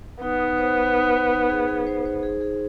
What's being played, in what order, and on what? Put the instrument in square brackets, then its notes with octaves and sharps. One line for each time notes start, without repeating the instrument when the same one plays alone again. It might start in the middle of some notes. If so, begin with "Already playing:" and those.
[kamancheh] B3 [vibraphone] D#4
[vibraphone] D#4
C5
C5
D#4
D#4
D#4
G#4
G#4
C5
C5
G#4
G#4